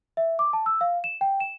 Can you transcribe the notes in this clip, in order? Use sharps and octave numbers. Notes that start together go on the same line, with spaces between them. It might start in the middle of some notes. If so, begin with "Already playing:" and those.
E5
D6
A5
E6
F5
E7
G5
E7